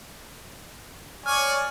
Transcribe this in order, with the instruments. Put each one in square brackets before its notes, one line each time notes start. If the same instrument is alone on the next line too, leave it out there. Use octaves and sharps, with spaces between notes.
[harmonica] C#5 D5 G#5 [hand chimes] F6